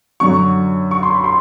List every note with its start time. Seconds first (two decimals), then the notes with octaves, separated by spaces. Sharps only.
0.20 F#2 D3 F#3 C#6
0.91 C#6
1.03 C6
1.14 B5
1.24 C6